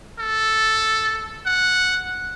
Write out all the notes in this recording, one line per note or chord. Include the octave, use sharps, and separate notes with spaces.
A4
F#5